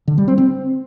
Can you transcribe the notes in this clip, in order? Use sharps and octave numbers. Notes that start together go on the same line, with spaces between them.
D3
G3
C4
C4